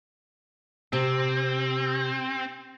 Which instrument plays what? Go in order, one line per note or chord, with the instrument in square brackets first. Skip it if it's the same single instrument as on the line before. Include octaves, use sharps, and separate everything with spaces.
[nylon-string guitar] C3 [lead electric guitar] C4